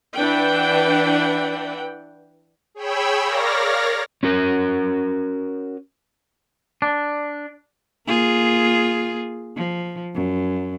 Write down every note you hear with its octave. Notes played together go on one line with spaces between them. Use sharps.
E3 D4 B4 F#5 G5
G#4 C#5 G5 B5 E6
A#4 C#5 D5 F5 A#6
C#4 F#4 A#4
D4
A#3 F4 G#4
F3
F#2